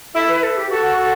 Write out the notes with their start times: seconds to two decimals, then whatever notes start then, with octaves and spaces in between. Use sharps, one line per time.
0.15 E4 A4
0.28 B4
0.43 A4
0.57 G4
0.70 F#4 A4
0.98 A4